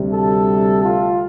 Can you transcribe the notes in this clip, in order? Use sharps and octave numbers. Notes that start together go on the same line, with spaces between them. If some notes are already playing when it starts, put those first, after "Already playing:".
Already playing: D2 C3 G3
A4
F4